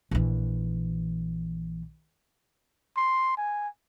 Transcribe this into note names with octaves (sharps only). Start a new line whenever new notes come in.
A#1 E3
C6
G#5